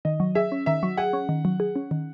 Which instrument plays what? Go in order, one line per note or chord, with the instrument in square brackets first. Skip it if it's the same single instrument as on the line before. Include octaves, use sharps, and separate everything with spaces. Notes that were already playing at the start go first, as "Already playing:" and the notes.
[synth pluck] D#3 [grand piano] D#5
[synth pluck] F#3
[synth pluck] G#4 [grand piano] E5
[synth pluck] C#4
[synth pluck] D#3 [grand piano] E5
[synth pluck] F#3
[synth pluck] G#4 [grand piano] F#5
[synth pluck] C#4
D#3
F#3
G#4
C#4
D#3